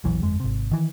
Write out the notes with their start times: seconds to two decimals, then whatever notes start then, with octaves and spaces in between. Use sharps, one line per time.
0.04 E1 A#1 E3 F#3
0.22 G1 F2 G#3
0.40 G#1 C3
0.71 D#3 E3